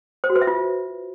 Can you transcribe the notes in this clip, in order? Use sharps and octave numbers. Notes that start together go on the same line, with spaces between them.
C5
F#4
B4
E5
F4